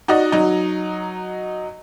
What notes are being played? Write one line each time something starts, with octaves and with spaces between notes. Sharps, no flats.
D#4 F#4 D5 D#5
F#3 D#4